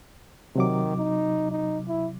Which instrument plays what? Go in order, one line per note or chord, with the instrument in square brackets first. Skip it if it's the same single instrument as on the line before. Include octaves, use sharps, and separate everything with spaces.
[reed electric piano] C3 F#3 D6 [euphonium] D#3
[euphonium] D#4
D#4
E4